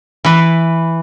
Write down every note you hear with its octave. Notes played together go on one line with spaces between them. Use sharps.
E3 B4